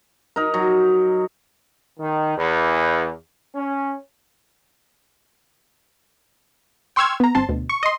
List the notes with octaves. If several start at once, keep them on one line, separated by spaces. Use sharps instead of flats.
D#4 A#4
F#3
D#3
E2
C#4
G5 C6 C#6 E6 F6 G#6
B3 A#5
G1 C4 A5 C6
D2 B2
C#6
D#5 C6